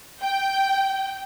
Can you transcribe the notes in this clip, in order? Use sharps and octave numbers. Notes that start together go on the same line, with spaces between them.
G5